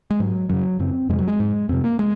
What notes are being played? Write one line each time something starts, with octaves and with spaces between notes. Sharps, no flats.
G#3
G#2 F#3
F#2 C#3 F#3
F#2 C#3 C4
F2 C3 G#3
F#3
G#3
G#2
F2 C3 C4
A#3
G#3